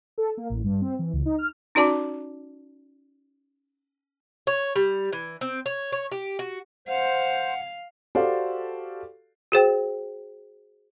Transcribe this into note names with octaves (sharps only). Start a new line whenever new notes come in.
A4
A#3
A1
G2
C4
E3
C#2
D#4
F6
C#4 D#4 F#4 D5 A5 D6
C#5
G3
E3
C4
C#5
C#5
G4
F#4
C5 F5 F#5
F#4 G4 A4 C5 D5 F5
F#4 G#4 C5 G5